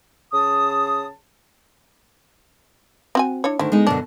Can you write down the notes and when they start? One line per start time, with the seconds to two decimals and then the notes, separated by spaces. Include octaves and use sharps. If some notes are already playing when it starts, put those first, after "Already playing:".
0.34 C#3 A5 D#6
3.15 C4 F#4 G#5
3.44 D4 E4 C#5
3.59 D2 D3 D#3
3.72 G#3 B3 D#4
3.87 F#2 B2 D3 D4